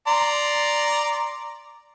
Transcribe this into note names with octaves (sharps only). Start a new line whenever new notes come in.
D5 A#5 C6